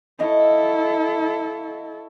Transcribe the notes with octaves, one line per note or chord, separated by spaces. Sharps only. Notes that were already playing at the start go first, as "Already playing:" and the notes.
E4 A4 C#5 D#5 F5